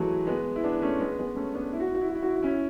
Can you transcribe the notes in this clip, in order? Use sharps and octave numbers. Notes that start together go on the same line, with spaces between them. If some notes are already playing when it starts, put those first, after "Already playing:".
Already playing: E3 F#3 G#3 A3
G#3 B3
E4
B3 D4
A3 C#4
G#3 B3
G#3 B3
A3 C#4
B3 D4
E4
F#4
E4
F#4
E4
F#4
E4
F#4
E4
F#4
C#4 E4